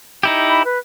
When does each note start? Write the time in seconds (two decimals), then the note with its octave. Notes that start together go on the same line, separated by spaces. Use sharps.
0.23 D#4 E4 G4
0.49 B5
0.65 B4